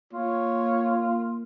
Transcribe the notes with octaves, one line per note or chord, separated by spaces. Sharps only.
A#3 F4 C#5